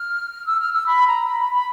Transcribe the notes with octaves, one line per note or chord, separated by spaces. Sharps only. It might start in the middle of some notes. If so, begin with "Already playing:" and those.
Already playing: F6
E6
F6
E6
B5
A#5
B5
B5
B5